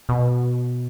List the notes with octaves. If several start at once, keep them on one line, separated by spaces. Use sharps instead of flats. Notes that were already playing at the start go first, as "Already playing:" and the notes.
B2